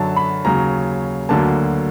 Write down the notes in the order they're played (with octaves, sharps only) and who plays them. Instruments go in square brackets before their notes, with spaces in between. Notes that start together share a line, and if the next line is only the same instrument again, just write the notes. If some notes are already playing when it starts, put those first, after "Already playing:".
Already playing: [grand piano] F#2 D3 F#3 A5
B5
D#2 C#3 F#3 A#5
D2 D3 F#3 A#3 A5